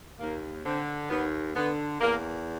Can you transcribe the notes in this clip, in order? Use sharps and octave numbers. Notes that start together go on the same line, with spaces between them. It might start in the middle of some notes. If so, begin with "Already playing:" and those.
D#2 A#3
D3 C4
D#2 B3
D3 B3
E2 A#3